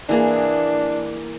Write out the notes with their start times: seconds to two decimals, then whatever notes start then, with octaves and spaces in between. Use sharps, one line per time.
0.09 E3 A#3 D4 G#4